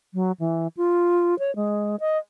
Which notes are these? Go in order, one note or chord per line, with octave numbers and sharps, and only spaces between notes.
F#3
E3
F4
C#5
G#3
D#5